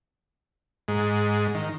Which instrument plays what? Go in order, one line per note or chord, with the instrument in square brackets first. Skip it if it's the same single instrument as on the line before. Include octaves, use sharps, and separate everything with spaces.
[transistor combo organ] G#2
D#3